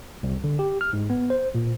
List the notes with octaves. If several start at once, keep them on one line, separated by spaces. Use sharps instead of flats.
C2
D3
G4
F6
G#2
B3
C5
A#2